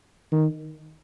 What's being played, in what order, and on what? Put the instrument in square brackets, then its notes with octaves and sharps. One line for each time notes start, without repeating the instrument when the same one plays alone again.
[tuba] D#3